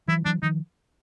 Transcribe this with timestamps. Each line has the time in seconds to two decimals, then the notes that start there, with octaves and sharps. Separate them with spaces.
0.08 E3 F#3 E4
0.25 E3 F#3 D4
0.42 D#3 F3 D#4